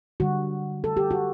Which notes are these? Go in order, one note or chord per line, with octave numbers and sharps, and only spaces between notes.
D3 G3 F#4
A4
G4
F#4